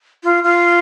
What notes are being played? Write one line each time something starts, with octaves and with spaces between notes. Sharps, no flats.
F4
F4